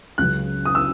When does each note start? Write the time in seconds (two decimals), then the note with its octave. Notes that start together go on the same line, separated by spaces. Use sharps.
0.18 C#2 C#3 F#3 F#6
0.65 D#6
0.75 E6